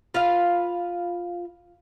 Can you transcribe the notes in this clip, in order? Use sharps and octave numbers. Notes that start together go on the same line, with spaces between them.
F4 B4 F5